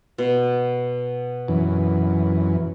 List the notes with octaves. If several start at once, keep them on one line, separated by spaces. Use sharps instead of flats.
B2
F#2 E3